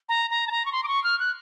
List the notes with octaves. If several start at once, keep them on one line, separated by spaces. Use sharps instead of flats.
A#5
A#5
A5
A#5
C#6
C6
D6
C#6
F6
F#6